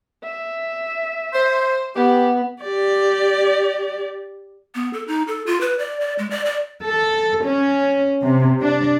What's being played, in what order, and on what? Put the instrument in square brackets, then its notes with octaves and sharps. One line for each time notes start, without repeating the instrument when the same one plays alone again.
[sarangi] E5
[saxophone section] C5
[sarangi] B3 [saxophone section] G4
[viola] G4 D5
[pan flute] B3
A4
D#4
A4
F4
B4
D5
D5
G#3
D5
D5
[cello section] A4
C#4
C3
D4